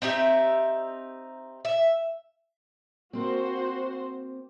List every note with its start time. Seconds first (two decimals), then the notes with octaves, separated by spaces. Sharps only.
0.02 C4 D#4 G4 E5
1.65 E5
3.13 A#3 C4 F#4 C5